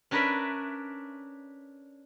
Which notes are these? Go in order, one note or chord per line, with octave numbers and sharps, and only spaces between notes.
C#4 D4 A#4 B4 D5 E5